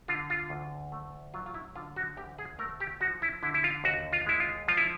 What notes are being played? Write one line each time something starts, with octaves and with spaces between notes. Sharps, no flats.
D3 F4
F4
D2
A3
F#3 F4
F4
E4
D3 F4
F#4
D2 G4
G#4
A3 A#4
G4
F3 F#4
E4
D3 E4
E4
F4
D#2 F#4
F4
G#3 E4
F4
F3 F4
E4